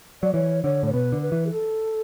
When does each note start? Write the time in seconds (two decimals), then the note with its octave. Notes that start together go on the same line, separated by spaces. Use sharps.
0.23 F#3 D5
0.34 E3 C#5
0.64 D3 C#5
0.83 A2 C#5
0.93 B2 B4
1.12 D3
1.22 B4
1.32 E3
1.47 G#4
1.51 A4